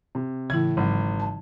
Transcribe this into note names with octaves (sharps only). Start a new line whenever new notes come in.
C3
A2 C#3 E3 E4 G#6
G#1 C#3 E3 F#3
A5